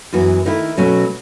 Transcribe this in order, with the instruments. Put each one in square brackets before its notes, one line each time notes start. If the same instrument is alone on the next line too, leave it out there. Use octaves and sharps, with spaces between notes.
[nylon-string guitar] F#2 E3 B3 F#4
D#3 A3 E4
B2 F#3 A3 C#4